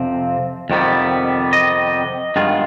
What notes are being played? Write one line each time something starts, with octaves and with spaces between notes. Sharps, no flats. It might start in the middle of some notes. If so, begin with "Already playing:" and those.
Already playing: F2 C3 F3 C4
F2 C3 D#3 G3 B3
D#5
G2 D#3 G#3 B3 F4